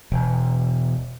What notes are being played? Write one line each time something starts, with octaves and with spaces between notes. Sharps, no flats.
E1